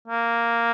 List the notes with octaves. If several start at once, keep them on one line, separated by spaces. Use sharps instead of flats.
A#3